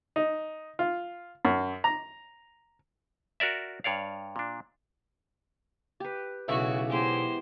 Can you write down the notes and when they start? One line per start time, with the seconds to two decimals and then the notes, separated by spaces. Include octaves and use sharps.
0.16 D#4
0.79 F4
1.45 F#2
1.84 A#5
3.40 F#4 A#4 D5 E5
3.84 G2 C#5 D5 F5
4.36 A#2 D4
6.00 G4 B4
6.48 B1 C#3 E3 F#4 E5 F#5 C#6
6.90 G#3 B3 E4 G4 C5